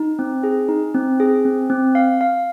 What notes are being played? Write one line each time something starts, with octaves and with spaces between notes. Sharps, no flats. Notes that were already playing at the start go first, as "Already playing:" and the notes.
Already playing: D#4
C4
G#4
D#4
C4
G#4
C4
C4
F5
F5